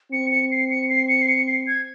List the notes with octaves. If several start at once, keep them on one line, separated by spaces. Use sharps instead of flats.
C4 C#7
C#7
C7
C#7
C7
C#7
C7
C#7
C7
G#6